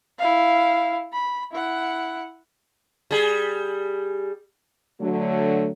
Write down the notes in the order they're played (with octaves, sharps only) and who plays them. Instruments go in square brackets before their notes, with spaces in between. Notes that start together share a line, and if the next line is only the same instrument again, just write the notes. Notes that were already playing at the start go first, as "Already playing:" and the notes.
[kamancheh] E4 F5
B5
E4 F#5
[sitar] G3 G#4
[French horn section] D3 F#3 A3